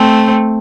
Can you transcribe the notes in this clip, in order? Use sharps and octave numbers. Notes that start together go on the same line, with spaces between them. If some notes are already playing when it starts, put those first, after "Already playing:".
Already playing: A3 C4